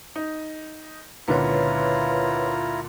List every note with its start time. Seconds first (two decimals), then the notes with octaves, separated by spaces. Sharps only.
0.16 D#4
1.28 C#2 A#2 D3 E4 F4 B4 C#5 A#5